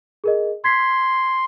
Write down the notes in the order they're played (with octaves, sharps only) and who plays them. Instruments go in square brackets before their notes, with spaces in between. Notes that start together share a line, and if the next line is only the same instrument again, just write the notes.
[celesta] G#4 A#4 D#5
[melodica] C6 [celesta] G#6 B6 C7